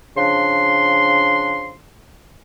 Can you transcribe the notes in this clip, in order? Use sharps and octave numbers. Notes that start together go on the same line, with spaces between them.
C#3 F3 D4 C6